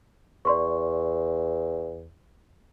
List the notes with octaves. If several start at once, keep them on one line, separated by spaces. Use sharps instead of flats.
E2 D5 C6 C#6